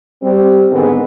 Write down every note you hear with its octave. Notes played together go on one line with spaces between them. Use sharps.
G3 C4
G#2 D3 D#3 G#3 B3 C4